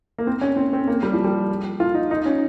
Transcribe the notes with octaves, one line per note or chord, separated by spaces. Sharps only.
A#3
C4
C#4
C4
C4
A#3
G3
F3
G3
F4
D#4
D#4
C#4